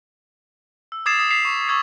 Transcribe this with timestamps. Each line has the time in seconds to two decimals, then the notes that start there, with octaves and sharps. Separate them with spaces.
0.92 E6
1.06 D6 D#6 G#6 A6 C7 E7
1.18 D#6 B6
1.30 B6 C7 F7
1.45 C#6
1.68 C#6 E6 G#6 C7 F7